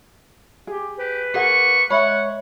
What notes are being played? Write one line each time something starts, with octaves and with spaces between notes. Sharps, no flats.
G4 G#4
G4 B4
A#3 G#4 A#4 F#5 C#6
G#3 C#5 D#5 E5 F#5 B5